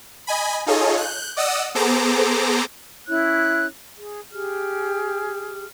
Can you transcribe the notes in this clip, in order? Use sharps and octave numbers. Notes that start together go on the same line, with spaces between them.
D#5 G#5 B5
D#4 F4 G#4 A4 C#5 D#5
F#6 G6
D5 D#5 F#5 D#6 E6
B3 G#4 A4 C5 A#5 D6
C#4 E4 C#5 F#6
G#4
G4 G#4 F6